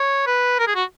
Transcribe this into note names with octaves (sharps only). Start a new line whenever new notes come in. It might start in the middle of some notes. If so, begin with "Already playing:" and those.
Already playing: C#5
B4
A#4
G#4
F#4